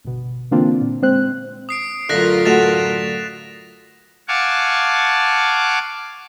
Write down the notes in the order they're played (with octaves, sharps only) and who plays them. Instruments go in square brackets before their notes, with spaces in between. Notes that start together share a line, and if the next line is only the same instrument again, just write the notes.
[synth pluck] G1 B2
D3 E3 A#3 C4 D4 F4
A#2
G#3 C4 C5 F#6
[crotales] D#6 C7 D7
[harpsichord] F#2 D3 [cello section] A2 F4 A#4 [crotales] F#6 A#6 B6
[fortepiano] A3 F#4 [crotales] A6 E7 F7
[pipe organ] F5 F#5 G#5 A5 C#6 D6